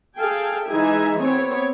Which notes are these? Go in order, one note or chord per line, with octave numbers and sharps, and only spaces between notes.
G#4 A4 F5 G5 G#5
E3 G#3 D#4 G#4 E5 G#5
B3 C4 C#5